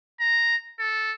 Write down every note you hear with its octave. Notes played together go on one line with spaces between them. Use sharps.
A#5
A4